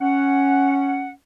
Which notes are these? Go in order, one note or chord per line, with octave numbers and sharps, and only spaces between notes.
C#4 F#5